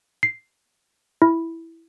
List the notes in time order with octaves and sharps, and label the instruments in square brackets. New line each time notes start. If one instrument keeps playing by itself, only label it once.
[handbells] C7
E4